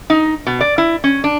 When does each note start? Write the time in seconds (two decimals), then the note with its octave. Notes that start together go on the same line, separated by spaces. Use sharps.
0.10 D#4
0.47 B2
0.61 D5
0.78 E4
1.04 C#4
1.24 D4